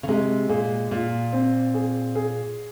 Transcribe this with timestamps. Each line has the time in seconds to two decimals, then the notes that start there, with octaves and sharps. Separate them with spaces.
0.03 C#3
0.08 C3 G#3
0.49 A#2 G#4
0.91 A#2 F4
1.33 C4
1.74 G#4
2.15 G#4